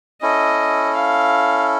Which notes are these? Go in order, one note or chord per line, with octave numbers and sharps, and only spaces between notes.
C#4 E4 A4 D#5
F5